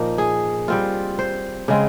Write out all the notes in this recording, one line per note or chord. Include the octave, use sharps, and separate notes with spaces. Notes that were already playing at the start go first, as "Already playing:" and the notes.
Already playing: A#2 F3 A#3 D#4
G#4
G3 C4 F4
C5
C#3 G#3 C4